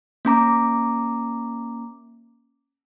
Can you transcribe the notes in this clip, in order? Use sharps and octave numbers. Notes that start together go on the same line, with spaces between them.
A#3 C#4 A#5 D6